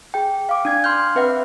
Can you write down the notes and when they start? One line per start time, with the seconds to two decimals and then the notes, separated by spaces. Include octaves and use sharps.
0.14 G#4 G5
0.49 F5 D6
0.65 D4 G#6
0.84 C6 F6 G6
1.15 C4 B4 E5 F#5